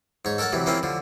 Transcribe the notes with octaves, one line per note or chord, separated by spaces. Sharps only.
G#2 C#5
A4 A#4 C#5 F#5 A5
C3 E3 F#3
E3 A#3 C4 C#4 F4
D3 F3